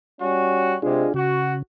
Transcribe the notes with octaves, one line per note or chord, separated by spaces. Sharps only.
G3 C#4 F#4
C3 G#3 D4 F4 G#4
C#3 F#4